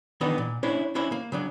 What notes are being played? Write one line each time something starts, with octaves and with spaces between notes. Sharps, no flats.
D#3 E3 B3 D4 D#4
A#2
A#3 C#4 D4 E4 C5 C#5
C#4 D4 E4 C5 C#5
A#3
C#3 F#3 D4